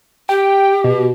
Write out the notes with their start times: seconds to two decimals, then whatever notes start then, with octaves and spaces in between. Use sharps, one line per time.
0.29 G4 G5
0.84 B2